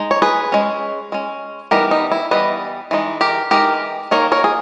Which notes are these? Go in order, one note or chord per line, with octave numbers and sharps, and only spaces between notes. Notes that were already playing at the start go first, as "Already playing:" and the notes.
Already playing: G#3 D#4
C#5
G#4 B4
G#3 C#4
G#3 C#4
E3 G3 B3 D#4 G4 A#4
D#4
E4
E3 G3 B3 B4 D#5
E3 G#3 D#4
G4 A#4
E3 G#3 D#4 G4 A#4
D#3 A#3 D#4 A#4 C#5
A#4 C#5
G#4